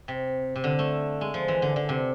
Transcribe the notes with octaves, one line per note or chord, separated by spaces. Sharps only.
C3
C3
D3
A3
G#3
F3
E3
D3
D3
C3